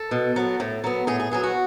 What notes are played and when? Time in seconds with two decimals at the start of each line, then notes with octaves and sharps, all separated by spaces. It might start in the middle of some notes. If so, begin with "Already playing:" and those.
Already playing: A4
0.11 B2
0.36 F#3 B3
0.60 A2
0.84 F#3 B3
1.07 A2 G#4
1.20 G#4
1.31 F#3 B3 G#4
1.43 F#4